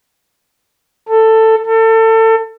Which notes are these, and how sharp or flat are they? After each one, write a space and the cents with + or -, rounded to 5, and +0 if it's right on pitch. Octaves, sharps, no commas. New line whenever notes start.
A4 +15
A4 +30